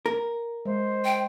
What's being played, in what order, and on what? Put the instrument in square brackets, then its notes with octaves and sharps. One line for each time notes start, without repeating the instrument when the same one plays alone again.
[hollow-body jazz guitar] A#4
[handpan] G#3 [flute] C5
[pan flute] G5